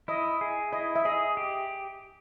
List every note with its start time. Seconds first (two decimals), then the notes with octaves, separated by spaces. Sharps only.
0.08 E4 D#5
0.41 G#4
0.72 E4 D#5
0.96 E5
1.05 G#4 D#5
1.37 G4